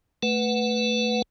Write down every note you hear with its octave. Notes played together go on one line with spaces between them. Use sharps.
A3 B4 F#5